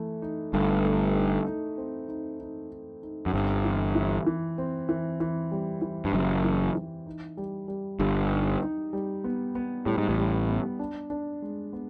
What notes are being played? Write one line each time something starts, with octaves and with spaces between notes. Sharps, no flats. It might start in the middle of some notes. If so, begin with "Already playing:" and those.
Already playing: E3 A3
D#4
G1 G2 A3
A3
D#4
D#4
C4
D#4
D#4
D#4
D#4
F#2
G1 G2 C4
E3
E3
E3
C4
E3
E3
G3
E3
G2
F#1 F#2 G3
E3
E3
D#4
G3
G3
G1 G2 G3
D#4
D#4
G3
B3
B3
A2 G3
G#2
A1 A2
G3
B3
D4
D4
G#3
B3